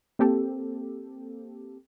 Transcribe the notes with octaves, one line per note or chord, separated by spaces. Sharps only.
A#3 C4 G4 A4